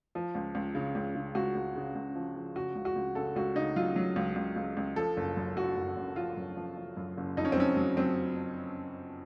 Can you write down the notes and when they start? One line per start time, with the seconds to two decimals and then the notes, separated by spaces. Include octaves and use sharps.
0.15 F3
0.35 C#2
0.55 C#2
0.75 C#3
0.95 C#2
1.15 C#3
1.35 C#2 F#4
1.55 C#2
1.76 C#3
1.95 C#2
2.15 F3
2.35 F3
2.56 C#3 F#4
2.75 C#2
2.85 F#4
2.96 C#2
3.15 C#3 A4
3.36 C#2 F#4
3.56 C#3 D#4
3.76 F#3 F4
3.96 F#3
4.16 C#2
4.36 C#2
4.56 C#2
4.77 C#2
4.96 F3 A4
5.17 F#1
5.37 F#2
5.56 F#1 F#4
5.77 F#1
5.96 F#1
6.16 F3 F4
6.37 F#2
6.57 F3
6.77 F3
6.97 F#2
7.17 F#1
7.37 F2 D#4
7.45 C#4
7.52 C4
7.57 F#3 C#4
7.77 F#3
7.97 F#3 C4